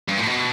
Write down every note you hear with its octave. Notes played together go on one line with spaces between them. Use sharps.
G2
A2
B2